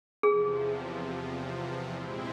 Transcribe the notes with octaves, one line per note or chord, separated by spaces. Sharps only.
E2 C3 F3 G#4
A#2 G#3 C4 E4